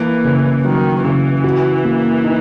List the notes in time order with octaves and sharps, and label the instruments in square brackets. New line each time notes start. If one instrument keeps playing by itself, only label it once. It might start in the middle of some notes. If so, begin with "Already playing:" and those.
Already playing: [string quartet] E3 [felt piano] A#3
[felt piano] C#3
[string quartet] D#3 [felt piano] F#3
[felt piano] C#3 [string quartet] E3
[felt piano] F#4
A#3
D#4